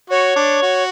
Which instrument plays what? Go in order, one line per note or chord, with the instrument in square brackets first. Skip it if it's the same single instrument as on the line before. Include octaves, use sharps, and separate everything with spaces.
[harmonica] F#4 [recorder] C#5
[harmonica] D4
F#4